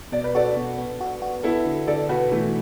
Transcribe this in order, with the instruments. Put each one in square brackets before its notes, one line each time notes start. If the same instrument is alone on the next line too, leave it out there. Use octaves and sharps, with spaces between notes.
[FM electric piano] B2 [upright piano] D5
[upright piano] B4
[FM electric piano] F#4 [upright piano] A4 D5
[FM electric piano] B2
B3
F#4
F#4
[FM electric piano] B3 [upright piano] E4 A4
[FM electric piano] D3
[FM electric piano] D3 [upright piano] A4 D5
[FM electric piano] B2 [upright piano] F#4 B4
[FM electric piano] B2 [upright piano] E3 A3